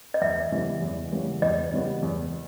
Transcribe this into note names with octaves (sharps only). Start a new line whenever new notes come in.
D#5
E2 E5
C#3 E3 G3 B3
E2
C#3 E3 G3 B3
E2 D#5
C#3 E3 G3 B3
E2